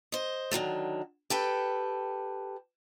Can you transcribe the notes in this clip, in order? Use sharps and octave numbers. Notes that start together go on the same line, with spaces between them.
C5 D#5
D3 D#3 F#3 A3
G4 A4 B4 G5